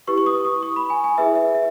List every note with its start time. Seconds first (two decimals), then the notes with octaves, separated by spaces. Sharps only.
0.07 E4 G4 B4 C#6
0.18 C#6
0.26 D#6
0.45 D#6
0.63 C#6
0.76 B5
0.90 G#5
1.04 G#5
1.18 E4 G#4 B4 E5
1.35 E5
1.55 E5